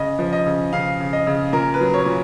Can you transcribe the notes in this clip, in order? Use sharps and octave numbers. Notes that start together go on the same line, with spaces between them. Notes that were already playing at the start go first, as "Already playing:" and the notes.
Already playing: C#3 D#5
F3
D#5
C#3
C#3 F5
C#3
D#5
C#3
A#2 A#4
B4
F#3
C#5
A#2